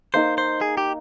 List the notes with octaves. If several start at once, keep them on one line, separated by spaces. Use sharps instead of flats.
A#3 D#4 A#4 C5
C5
G#4
G4